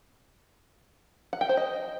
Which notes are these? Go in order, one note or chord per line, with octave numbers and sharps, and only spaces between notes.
F#5
G5
C5
D#5